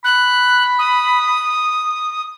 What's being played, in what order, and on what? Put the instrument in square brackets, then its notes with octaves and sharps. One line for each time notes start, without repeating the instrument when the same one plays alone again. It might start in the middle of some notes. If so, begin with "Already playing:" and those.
[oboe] B5 [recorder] F#6
[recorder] D#6